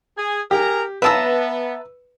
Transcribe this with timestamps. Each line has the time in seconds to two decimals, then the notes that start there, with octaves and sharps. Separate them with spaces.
0.17 G#4 G#5
0.51 G4 G#4 A#4 A#5
1.02 B3 B4 E5 A5 A#5 E6